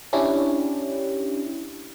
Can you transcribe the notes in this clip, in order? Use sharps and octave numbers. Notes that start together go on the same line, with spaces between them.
C#4 D4 E4 G4 C#5